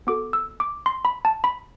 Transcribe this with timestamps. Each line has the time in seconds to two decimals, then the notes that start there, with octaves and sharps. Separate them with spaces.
0.07 B3 F#4 A4 D6
0.33 E6
0.60 D6
0.86 C6
1.05 B5
1.25 A5
1.44 B5